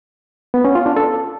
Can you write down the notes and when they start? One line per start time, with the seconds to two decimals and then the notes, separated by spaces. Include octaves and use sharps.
0.54 B3
0.65 C#4
0.75 F4
0.86 D4
0.97 A4